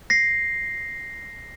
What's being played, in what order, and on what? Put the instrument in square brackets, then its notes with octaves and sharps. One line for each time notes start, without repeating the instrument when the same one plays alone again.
[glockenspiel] A#6 C7